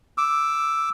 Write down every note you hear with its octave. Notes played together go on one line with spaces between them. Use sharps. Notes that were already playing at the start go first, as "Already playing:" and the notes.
D6 E6